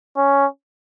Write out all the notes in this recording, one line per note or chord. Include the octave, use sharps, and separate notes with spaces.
C#4